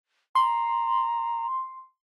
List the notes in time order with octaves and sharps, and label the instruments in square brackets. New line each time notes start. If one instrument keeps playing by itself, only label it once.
[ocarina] A#5 [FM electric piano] C6